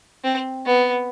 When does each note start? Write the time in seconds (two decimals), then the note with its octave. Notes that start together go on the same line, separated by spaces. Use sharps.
0.24 C4
0.66 B3